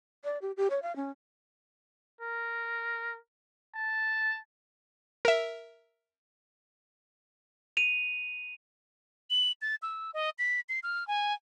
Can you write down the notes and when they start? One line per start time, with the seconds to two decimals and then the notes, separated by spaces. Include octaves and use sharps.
0.24 D5
0.42 G4
0.57 G4
0.70 C#5
0.82 F5
0.96 C#4
2.21 A#4
3.76 A5
5.25 A#4 E5
7.77 D#7 F7
9.30 F#7
9.62 A6
9.82 E6
10.14 D#5
10.38 B6
10.69 C7
10.83 F6
11.07 G#5